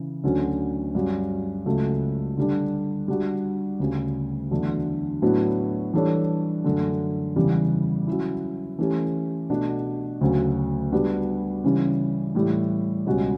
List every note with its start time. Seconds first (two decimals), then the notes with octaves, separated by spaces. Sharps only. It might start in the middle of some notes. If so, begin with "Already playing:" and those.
Already playing: C#3 E3
0.24 D2 D3 F#3 C#4
0.95 G2 F#3 C#4
1.66 C#2 C#3 F#3 A3
2.37 D3 G3 D4
3.08 G3 D4 F#4
3.80 D2 C#3 G3
4.51 E2 D3 F#3 A3 D4
5.22 A2 F#3 B3 D4 F#4
5.93 E3 G3 D4 A4 C#5
6.64 F#2 D3 A3
7.36 E2 C#3 E3 G3
8.07 F#3 C#4 E4
8.79 E3 A3 C#4 G4
9.50 B2 A3 D4 F#4
10.21 D2 C#3 F#3
10.92 G3 B3 D4 F#4
11.64 C#3 E3 G3 C#4
12.35 A2 E3 G3
13.06 C#2 B2 G3 C#4 F#4